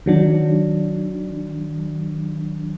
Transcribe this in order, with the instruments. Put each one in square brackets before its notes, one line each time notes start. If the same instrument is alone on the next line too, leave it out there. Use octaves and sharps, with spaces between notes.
[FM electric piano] D#3 F#3 D4